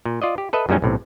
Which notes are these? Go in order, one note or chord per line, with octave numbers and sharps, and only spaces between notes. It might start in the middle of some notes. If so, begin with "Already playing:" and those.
A#2
F4 D5 D#5
G4
A4 B4 D#5 E5
F#2 A#2 G3 G#3 C#4 D#4
B1 A2 C3